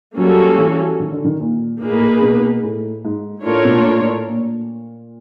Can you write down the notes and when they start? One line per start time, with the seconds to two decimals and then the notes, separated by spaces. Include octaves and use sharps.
0.17 F#3 G3 A#3 C#4 F#4 A4
0.59 E3
1.00 D#3
1.12 D3
1.25 D#3
1.40 A#2
1.81 A#2 A#3 D#4 G#4 B4
1.91 A2
1.99 A#2
2.22 B2
2.63 A2
3.05 G#2
3.45 A2 A3 D4 F4 A#4 C#5
3.65 B2
3.73 A#2
3.89 A#2
4.00 A2
4.27 A#2